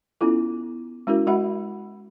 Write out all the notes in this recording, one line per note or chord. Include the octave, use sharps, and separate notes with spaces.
B3 C#4 E4 F4 A4
G#3 C#4 E4 F#4 A#4
G#3 F#4 D#5 E5 F#5 B5